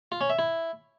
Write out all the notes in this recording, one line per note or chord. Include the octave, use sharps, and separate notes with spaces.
F4
C#4
E5
E4